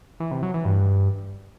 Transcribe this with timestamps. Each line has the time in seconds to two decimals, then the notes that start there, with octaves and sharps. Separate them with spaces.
0.20 E3
0.31 C3
0.43 F#3
0.54 E3
0.65 G2